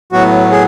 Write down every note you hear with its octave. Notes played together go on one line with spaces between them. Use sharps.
A2 F#3 B3 F#4
G#4